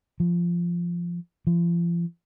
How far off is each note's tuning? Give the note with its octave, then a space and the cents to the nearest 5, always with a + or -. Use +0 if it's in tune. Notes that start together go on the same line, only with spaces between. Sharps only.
F3 -10
F3 -35